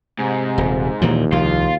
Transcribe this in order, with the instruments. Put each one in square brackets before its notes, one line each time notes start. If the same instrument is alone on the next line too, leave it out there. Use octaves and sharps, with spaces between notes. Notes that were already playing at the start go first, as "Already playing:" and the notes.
[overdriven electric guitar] G#2 [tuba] C3
[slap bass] D#1
[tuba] D#2 [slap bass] A#2 E3 F3
[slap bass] C2 F3 A#3 [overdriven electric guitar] F4